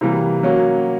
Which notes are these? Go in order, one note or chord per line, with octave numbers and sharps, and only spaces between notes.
C3 E3 G3 A#3
F#3 A#3 C#4 F#4